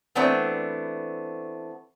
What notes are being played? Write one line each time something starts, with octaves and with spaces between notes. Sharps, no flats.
E3 A3 B3 C4 D4